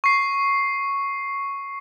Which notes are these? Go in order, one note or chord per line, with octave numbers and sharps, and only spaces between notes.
C#6 C7